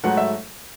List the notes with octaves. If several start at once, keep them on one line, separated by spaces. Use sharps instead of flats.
G#2 F#3 A3 F#5
E5